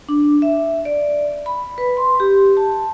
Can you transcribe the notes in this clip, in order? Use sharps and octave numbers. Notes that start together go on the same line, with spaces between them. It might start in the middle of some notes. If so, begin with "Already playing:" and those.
D4
E5
D5
B5
B4
C6
G4
A5